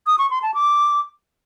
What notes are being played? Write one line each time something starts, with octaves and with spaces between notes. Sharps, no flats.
D#6
C#6
C6
A5
D6